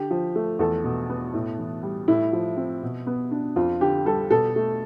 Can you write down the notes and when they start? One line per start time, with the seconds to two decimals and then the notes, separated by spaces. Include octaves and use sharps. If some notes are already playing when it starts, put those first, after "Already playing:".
Already playing: D3 G4
0.11 F3
0.35 A3
0.59 E2 A4
0.84 B2
1.10 B3
1.34 A2
1.59 E3
1.83 G3
2.08 A2 E4
2.33 F3
2.57 C4
2.83 B2
3.07 B3
3.31 D4
3.56 F2 F4
3.81 D3 G4
4.05 G3 A4
4.31 B2 A4
4.56 A3